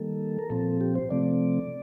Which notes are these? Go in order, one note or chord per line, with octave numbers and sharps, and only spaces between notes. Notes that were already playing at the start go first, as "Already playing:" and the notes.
Already playing: D#3 G3 A#3 A4
A#4
A#2 F3 C4 A4
G4
C5
C3 F3 A3 C4 D5